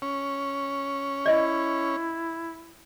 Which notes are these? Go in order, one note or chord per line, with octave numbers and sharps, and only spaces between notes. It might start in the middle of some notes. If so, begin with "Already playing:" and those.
C#4
E4 D5 D#5